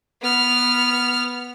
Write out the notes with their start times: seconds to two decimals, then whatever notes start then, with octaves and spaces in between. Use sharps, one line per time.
0.22 B3 F6